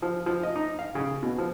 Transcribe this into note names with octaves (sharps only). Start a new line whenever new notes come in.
F3
F3
D#5
D#4
F5
C#3
B2
F3